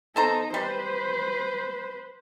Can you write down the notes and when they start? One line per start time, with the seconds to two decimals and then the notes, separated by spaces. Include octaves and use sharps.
0.16 B3 D#4 A4 C5 A#5
0.54 G3 B4 C5